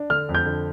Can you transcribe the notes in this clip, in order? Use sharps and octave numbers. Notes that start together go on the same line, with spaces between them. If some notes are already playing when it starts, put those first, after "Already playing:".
Already playing: D4
D3 F6
F2
G6
D3